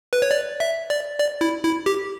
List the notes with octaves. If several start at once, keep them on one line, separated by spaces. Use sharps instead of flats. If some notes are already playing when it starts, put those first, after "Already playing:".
B4
C#5
D5
E5
D5
D5
E4
E4
G4